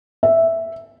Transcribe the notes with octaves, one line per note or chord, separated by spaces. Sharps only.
E5